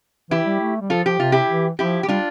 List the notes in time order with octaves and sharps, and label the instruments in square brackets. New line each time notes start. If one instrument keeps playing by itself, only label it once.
[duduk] E3 [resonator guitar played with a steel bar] E4 G4
[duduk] G3
A3
G3
[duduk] F3 [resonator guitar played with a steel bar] F4 A4
[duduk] F3 [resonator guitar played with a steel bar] G4
[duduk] C3 [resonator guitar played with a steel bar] F4
[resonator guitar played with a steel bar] E4 G4
[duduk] E3
[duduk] F3 [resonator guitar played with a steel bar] E4 G4
[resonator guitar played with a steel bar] G4
[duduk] G3 [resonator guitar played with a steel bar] D4 F4